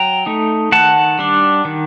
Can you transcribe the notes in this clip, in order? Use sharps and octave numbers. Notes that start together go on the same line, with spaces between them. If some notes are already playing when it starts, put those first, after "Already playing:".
Already playing: F#3 G5 A#5
A3 D#4
D#3 F#5 A5
G3 D4
D#3